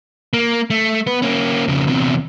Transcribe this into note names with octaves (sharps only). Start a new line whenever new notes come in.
A#3
A3
B3 B4
A#3 C#4
F2 C#3
E2 C3